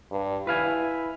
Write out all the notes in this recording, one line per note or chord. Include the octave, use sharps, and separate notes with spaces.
G2
E4 B4 F5 G#5